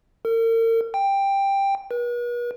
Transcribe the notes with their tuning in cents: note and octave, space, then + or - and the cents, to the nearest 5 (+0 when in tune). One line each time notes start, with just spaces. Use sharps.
A#4 -40
G5 +10
B4 -45